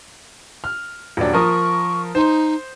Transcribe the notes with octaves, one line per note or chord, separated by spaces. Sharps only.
F6
D#1 F#3 D4
F3 A#4 C#6 D#6
D#4 C5 C6